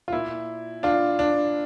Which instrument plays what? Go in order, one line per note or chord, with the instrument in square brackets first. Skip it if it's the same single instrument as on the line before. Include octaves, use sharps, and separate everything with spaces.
[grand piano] F4
A#2 E4
D4 F4
D4